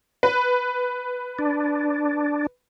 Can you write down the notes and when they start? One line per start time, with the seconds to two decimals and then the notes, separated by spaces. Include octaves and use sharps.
0.23 B4
1.39 D4